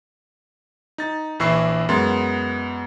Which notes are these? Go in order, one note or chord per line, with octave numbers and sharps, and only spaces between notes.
D#4 A6
A#1 E3 E4 C#6 E6 C7
F#2 G#3 B3 C6 A6